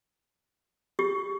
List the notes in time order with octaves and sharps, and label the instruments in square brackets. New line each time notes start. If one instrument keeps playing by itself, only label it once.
[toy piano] G4